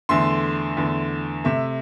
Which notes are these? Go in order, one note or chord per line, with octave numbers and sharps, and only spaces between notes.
E2 D3 A3 C6
E2 D3 A3
C3 A3 E5